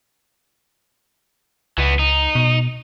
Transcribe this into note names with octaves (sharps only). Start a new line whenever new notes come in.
C#2 E3 B3
D#4
B2